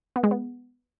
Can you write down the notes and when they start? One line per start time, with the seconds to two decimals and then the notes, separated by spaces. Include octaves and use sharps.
0.16 B3
0.23 G#3
0.31 B3